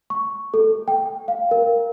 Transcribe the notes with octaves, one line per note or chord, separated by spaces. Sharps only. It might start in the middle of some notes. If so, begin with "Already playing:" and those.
C#6
A4
G5
F5
A#4